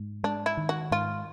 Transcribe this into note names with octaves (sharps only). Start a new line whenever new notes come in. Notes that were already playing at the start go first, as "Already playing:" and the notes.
Already playing: G#2
G#3 D4
E4
D#3
F#4
G#2 F4